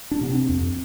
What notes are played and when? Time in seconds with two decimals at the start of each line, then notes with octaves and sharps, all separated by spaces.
0.11 D4
0.21 C3 B3
0.30 C4
0.49 F2